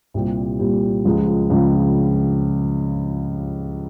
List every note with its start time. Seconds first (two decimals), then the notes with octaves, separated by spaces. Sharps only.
0.14 C2 A#2 G3 C4 G4
0.59 C2 A#2 G3 C4 G4
1.05 C#2 C#3 F3 G#3
1.50 C#2 C#3 F3 G#3